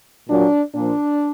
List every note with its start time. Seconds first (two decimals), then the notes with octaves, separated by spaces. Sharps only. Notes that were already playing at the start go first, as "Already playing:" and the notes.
0.30 A#2 F#3 D4
0.74 A#2 F3 D4